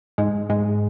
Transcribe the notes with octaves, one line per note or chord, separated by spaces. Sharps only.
G#2 G#3
G#2 G#3